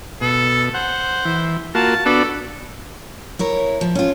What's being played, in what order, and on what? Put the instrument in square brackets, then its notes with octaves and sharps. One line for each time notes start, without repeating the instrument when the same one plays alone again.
[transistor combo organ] B2 [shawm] A4
[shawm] C5 [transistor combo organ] F#5
[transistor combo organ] E3
[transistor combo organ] A#3 F4 F#4 [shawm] A5
[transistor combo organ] B3 D4 F#4 [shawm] A4
[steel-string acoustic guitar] E4 A#4 C#5
F3
C#4 F4